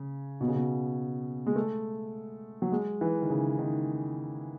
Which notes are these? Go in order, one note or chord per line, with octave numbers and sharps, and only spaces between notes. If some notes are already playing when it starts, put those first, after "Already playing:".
Already playing: C#3
B2
C#3
B2
G#3
A3
F#3
G#3
E3
D#3
C#3
D#3